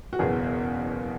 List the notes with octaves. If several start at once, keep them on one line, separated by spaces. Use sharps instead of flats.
F#4
F#1 E2 B2 G#4